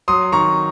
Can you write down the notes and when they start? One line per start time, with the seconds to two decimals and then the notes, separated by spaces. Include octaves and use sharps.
0.08 F#3 C6 D#6
0.32 D#3 A#5 C#6